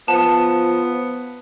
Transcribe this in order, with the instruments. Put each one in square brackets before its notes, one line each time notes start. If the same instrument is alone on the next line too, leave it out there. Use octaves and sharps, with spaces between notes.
[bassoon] F3 [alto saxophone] B3 [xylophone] A5